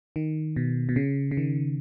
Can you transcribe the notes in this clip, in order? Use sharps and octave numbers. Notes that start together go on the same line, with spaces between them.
D#3
B2
B2
C#3
C#3
D#3